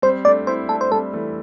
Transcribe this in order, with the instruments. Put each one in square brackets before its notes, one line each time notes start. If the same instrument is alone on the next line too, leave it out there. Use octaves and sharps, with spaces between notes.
[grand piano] G3 C4 [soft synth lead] C5
[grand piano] A3 D4 [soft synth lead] D5
[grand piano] C4 E4 [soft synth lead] C5
[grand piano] A3 D4 [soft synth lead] A4
[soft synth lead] C5
[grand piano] G3 C4 [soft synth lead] A4
[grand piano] E3 A3